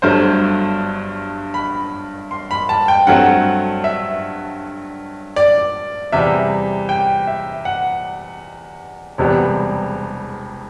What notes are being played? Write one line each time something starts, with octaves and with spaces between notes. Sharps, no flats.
G1 G2 F#3 A3 C5
B5
C6
B5
A5
G5
G2 F#3 A3 C4 F#5
E5
D5
E2 C3 G3 E5
G5
E5
F#5
E1 E2 C3 G3 B3